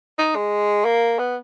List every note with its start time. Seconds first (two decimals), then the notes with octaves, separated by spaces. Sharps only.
0.19 D#4
0.36 G#3
0.85 A#3
1.19 B3